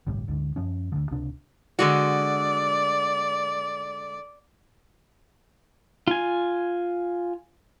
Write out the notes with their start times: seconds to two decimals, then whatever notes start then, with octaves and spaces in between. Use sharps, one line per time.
0.07 G1 C2 A2 G3
0.28 D2 G#2 D3
0.56 F#2 F3 C#4
0.92 D2 D3 F3
1.11 C#2 C3 D4
1.79 D3 G#3 F#4 D5
6.07 F4 G#5